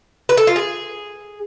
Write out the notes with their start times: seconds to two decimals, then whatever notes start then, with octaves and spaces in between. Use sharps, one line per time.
0.29 B4
0.37 A4
0.47 F4
0.56 G#4